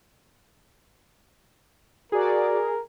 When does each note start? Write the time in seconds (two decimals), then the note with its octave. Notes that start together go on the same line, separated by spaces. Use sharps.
2.12 F#4 G#4 A#4 D5